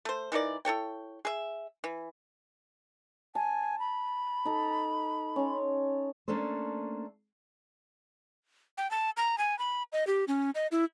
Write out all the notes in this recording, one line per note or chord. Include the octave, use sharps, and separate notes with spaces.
A3 C5
E3 D#4 A#4 D5
E4 A4 C#5 G5
G#4 E5
E3
G#5 A5
B5
D#4 A4 A#5
C#4 C6
A3 A#3 C#4 D4 A4 C5
G5
A5
A#5
G#5
B5
D#5
G4
C#4
D#5
E4